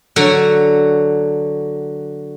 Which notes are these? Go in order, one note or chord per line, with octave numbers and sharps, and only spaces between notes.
D3 F#3 F#4 C#5